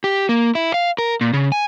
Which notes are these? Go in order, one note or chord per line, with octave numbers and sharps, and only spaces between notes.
G4
A#3
E4
F5
A#4
A#2
C#3
G#5